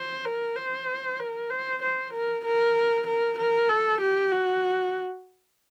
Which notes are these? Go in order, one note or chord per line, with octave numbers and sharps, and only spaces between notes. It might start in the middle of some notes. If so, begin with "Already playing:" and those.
Already playing: C5
A#4
C5
A#4
C5
C5
A#4
A#4
A#4
A#4
A4
G4
F#4